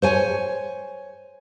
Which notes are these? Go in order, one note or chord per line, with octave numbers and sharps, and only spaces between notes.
C5 C#5 G#5